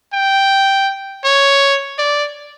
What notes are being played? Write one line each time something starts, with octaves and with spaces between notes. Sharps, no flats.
G5
C#5
D5